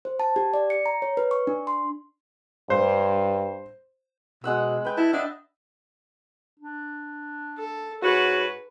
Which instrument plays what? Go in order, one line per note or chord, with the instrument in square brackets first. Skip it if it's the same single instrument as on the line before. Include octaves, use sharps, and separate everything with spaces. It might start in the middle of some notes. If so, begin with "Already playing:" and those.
[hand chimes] C5
A5
G4
D5
C#7
A#5
C#5
B4
C#6
D4
C6
[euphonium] G2 [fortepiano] C5
[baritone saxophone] B2 [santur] G#3 F#5 E6
[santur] B4 G5
[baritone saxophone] E4 [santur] A5
[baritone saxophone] D4 [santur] D#5 E5 F#5
[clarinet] D4
[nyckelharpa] A4
[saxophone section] G#2 F#4 [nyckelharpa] B4 [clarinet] C#5